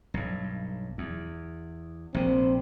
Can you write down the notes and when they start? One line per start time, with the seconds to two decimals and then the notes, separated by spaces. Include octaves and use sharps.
0.14 B1 G2
0.98 E2
2.14 A#1 C3 C4